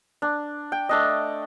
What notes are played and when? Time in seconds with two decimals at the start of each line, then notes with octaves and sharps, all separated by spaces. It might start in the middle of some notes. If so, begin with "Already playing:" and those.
0.22 D4
0.72 G5
0.89 A3 D4 D#5